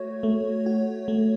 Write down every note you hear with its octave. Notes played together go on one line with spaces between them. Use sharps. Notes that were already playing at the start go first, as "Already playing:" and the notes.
Already playing: A3 F#4 C#5
A3
F#4
A3